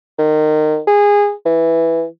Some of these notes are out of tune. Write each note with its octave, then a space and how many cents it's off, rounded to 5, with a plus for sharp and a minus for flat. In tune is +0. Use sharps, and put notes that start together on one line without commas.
D#3 -20
G#4 -20
E3 +0